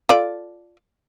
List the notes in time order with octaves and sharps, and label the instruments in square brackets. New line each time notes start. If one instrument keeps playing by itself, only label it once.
[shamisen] F4 A4 D5